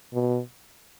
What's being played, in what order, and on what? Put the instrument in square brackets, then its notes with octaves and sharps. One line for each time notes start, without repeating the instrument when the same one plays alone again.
[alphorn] B2